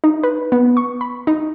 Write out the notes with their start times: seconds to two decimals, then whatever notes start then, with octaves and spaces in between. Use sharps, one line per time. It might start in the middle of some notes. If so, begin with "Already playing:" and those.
0.04 D#4
0.23 B4
0.52 B3
0.77 C#6
1.01 B5
1.27 D#4